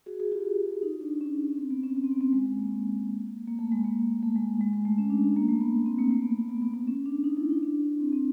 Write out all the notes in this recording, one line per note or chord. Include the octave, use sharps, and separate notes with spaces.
F#4 G#4
F#4 G#4
F4 G4
D#4
D4
C#4
C4
B3
C#4
C#4
C4
B3
C4
G#3
G#3
A#3
A#3
A3
G#3
A#3
A3
G#3
G#3
G#3
A3
C#4
D4
D4
A#3
A3
B3
C4
A#3
A3
B3
A#3
B3
B3
B3
C#4
D4
D#4
E4
E4
D4
C4
C4